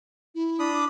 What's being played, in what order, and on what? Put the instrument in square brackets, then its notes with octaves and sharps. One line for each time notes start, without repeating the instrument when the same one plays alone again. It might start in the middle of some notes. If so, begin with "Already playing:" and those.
[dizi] E4
[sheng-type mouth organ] D4 B5 D#6
[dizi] D6